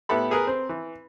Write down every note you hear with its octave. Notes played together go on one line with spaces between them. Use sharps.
A2 B3 E4 G4 A4 B5
G#4 A#4 B4
C4
E3